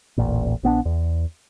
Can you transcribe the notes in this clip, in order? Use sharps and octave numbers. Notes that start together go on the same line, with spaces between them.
D#1 A1 A#2
A#1 B3 C4 D4
E2